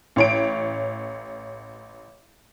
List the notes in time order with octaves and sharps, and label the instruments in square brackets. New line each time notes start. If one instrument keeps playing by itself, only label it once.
[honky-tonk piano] A1 C#5 D7